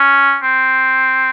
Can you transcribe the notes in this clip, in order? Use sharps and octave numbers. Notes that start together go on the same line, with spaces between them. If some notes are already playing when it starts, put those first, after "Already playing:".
Already playing: C#4
C4